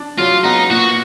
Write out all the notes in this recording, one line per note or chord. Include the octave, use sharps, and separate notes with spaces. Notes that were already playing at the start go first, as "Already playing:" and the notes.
Already playing: D4
F#3 F4
B3 D#4
A#2 F#4